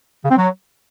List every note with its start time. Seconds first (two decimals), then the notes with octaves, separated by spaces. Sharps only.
0.24 C#3
0.30 C4
0.37 F#3